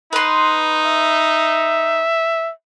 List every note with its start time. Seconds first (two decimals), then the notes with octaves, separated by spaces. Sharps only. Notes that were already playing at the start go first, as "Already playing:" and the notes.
0.13 D#4 B4 C6
0.85 E5